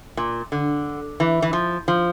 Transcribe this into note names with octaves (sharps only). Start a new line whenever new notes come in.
A#2
D3
E3
E3
F3
F3